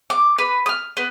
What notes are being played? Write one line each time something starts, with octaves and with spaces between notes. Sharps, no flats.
D6
B4
D#6 F6
B3